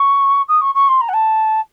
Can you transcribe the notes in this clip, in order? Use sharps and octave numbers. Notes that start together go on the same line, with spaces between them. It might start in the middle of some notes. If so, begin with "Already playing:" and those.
Already playing: C#6
D#6
C#6
C#6
C6
A#5
F#5
A5